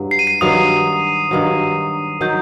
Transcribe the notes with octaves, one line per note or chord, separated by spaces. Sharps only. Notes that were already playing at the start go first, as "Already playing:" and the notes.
Already playing: G2 F#3
C7
D#7
C7
G2 D#3 F#3 D#6
G2 D#3 F#3
D#3 F#3 G6